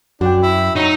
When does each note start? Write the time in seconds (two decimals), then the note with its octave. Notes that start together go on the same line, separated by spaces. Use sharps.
0.21 F#2 D4 F#4 G5
0.43 E4
0.76 F#3 D#4